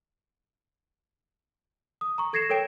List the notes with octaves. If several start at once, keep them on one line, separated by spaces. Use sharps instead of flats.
D#6
A#5 C#6
A4 G#6 A#6 C7 C#7 E7
A4 A#4 C#5 G5 D7 E7